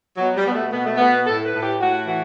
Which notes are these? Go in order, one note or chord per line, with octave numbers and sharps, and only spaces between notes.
B2 F#3
G3
B2 B3
A3
B2 B3
A3
B2 B3
A2 A4
B4
A2
G4
A2 F#4
E3 F#4